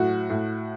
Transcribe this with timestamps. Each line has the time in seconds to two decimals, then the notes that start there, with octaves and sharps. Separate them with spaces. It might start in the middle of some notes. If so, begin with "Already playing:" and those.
Already playing: A2 F#3 F#4
0.30 A2